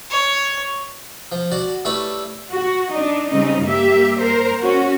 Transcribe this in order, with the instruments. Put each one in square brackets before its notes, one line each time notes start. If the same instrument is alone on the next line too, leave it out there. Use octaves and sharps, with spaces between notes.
[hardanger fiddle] C#5
[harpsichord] F3
F#4 D5 A5
G3 A3 E4 B4 C#5 E5
[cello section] F#4
D4 D#4
C#3 G3 C4 C#4 D#4
G2 A#3 G4 E5
A#4 C5
C#4 F#4